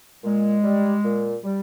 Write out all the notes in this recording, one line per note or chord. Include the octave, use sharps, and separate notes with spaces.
A#2 G#3
G3
A#2
G3